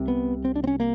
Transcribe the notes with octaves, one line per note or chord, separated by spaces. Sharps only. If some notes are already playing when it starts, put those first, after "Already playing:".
Already playing: C2 C3
B3
C4
D4
C4
C#4
A#3